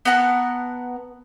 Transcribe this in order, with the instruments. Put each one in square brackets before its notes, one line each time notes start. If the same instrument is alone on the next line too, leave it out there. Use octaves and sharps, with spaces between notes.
[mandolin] B3 A#4 F#5 A5